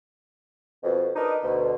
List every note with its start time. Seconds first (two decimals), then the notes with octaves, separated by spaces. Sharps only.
0.83 F2 B2
1.16 D4 D#4 A#4 B4 D#5
1.42 D2 B2